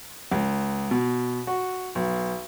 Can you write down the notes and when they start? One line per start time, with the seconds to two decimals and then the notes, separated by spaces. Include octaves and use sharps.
0.32 C#2
0.91 B2
1.47 F#4
1.95 B1